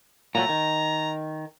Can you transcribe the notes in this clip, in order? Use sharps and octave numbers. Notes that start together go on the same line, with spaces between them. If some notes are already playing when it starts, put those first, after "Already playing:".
A#2 F#3 A3 A#5
D#3